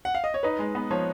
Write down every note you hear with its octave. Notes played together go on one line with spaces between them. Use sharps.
F#5
F5
D#5
C#5
D#4 B4
G#3
B3
F3 C#5